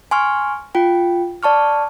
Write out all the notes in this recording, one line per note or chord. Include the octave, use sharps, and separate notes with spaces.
G#5 C6 C#6 F6
F4 G5
D5 A5 C#6 F6